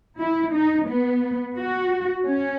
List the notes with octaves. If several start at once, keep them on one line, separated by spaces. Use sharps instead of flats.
E4
D#4
B3
F#4
C#4